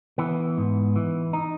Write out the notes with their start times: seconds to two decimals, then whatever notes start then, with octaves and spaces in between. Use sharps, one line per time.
0.18 E3 B3
0.58 G#2
0.96 E3
1.33 D#4